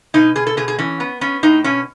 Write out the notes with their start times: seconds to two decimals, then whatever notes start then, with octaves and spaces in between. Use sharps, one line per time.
0.14 B2 D#4
0.36 B2 G#4
0.47 A4
0.57 B2 G#4
0.68 G#4
0.78 E3 C#4
1.00 B3
1.21 B3 C#4
1.43 A2 D#4
1.64 B2 C#4